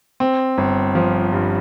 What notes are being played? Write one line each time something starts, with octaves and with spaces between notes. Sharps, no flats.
C4
G1
F3
G2